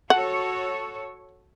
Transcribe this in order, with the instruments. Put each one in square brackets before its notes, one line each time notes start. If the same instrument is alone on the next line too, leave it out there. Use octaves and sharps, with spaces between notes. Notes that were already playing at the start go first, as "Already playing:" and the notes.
[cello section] F#4 A4 C#5 [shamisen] F#5